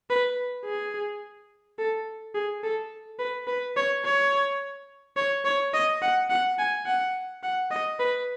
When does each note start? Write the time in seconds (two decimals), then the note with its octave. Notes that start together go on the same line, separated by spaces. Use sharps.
0.10 B4
0.65 G#4
1.79 A4
2.35 G#4
2.63 A4
3.19 B4
3.47 B4
3.76 C#5
4.04 C#5
5.17 C#5
5.45 C#5
5.74 D#5
6.02 F#5
6.30 F#5
6.59 G#5
6.86 F#5
7.43 F#5
7.71 D#5
7.99 B4